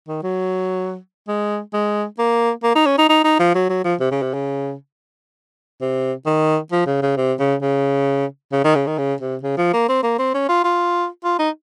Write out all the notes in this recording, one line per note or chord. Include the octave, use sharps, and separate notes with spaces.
D#3
F#3
G#3
G#3
A#3
A#3
D#4
C#4
D#4
D#4
D#4
F3
F#3
F#3
F3
C3
C#3
C3
C#3
C3
D#3
F3
C#3
C#3
C3
C#3
C#3
C#3
D#3
C#3
D#3
C#3
C3
C#3
F3
A#3
C4
A#3
C4
C#4
F4
F4
F4
D#4